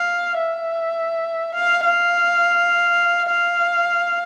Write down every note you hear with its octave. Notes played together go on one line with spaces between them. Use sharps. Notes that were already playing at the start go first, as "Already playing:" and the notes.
Already playing: F5
E5
F5
F5
F5